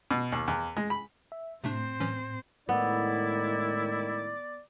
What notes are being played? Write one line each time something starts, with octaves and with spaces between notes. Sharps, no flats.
B2
D#2
E2
G#3
B5
E5
A2 C3 A3 C4 D4 C5
E3 F#3 C#4
A2 D#3 G#3 B3 E4 D5